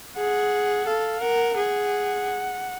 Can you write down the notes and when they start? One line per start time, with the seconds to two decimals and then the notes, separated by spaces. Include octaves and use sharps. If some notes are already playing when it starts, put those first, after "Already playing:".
0.18 G#4 F#5
0.87 A4 F5
1.21 A#4 F#5
1.56 G#4 F#5